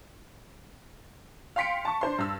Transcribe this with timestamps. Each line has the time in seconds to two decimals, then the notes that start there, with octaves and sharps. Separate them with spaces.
1.56 F5 G5 C6 B6 C#7 D7
1.85 A5 C#6
2.01 D4 C5 C6
2.18 G2 E6